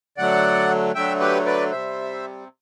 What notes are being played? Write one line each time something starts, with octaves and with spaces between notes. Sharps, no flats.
D3 F#3 A3 D5 F#5
D3 F#3 A3 E5 G5
G4 B4
B4 D5
C3 G3 C5 E5